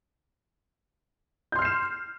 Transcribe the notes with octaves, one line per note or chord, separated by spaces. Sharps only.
C6 F6 G6 C7 E7